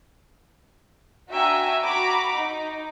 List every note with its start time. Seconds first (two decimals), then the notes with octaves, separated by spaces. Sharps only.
1.31 D4 F#4 E5 G5 G#5 A#5
1.84 F#4 A#5 B5 D6
2.36 D#4